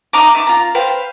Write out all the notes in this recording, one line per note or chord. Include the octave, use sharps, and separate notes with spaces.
D#4 D#5 A#5 D6
E5 C6 D6
F4 A#5
B4 C5 F5 G5